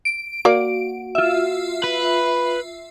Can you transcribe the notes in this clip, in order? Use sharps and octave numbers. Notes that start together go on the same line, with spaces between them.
D7
A#3 F#4 D5
F4 E5
B4